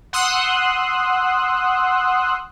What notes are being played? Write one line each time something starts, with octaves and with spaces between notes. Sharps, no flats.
F#5 C6 D#6 E6 F#6